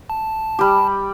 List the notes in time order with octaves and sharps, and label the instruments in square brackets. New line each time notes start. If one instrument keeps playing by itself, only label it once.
[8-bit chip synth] A5
[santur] G3 G4